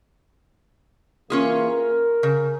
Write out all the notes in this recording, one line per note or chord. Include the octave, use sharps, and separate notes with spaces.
E3 A#3 C#4 F4 G#4
A#4
C#3